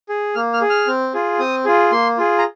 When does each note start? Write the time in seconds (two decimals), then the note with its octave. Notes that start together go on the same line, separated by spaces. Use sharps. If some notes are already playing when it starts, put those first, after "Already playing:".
0.09 G#4
0.35 A#3 F6
0.54 F6
0.61 G#4
0.70 F6
0.87 C4
1.14 F4 G#4
1.39 C4 D#6
1.65 F4 G#4
1.92 A#3 C6
2.18 F4 G#4
2.38 A#5